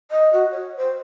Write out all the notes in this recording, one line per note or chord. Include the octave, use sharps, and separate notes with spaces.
D#5
F#4
C#5
C5